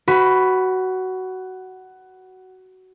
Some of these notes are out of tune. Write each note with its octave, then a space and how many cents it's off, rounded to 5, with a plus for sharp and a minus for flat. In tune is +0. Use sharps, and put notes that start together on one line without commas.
F#4 +15 B4 +35 B5 +0